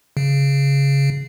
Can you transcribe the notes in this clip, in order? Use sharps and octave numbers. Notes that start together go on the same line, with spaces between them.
C#3